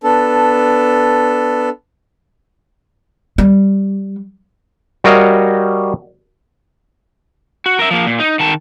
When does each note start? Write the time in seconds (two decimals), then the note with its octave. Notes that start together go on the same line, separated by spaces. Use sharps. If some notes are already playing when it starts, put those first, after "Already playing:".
0.04 B3 D4 A4
3.38 G3
5.04 G3 F#4 A#4 C#5 D#5 F5
7.66 F#4
7.79 A#4 E5
7.91 F3 A#3
8.07 A#2
8.20 D#4
8.40 D#3 A5